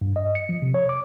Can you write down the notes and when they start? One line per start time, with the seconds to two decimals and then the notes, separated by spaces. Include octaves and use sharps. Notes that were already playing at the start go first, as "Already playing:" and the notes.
0.01 G2
0.16 D#5
0.35 C#7
0.49 F3
0.62 C3
0.74 C#5
0.89 D6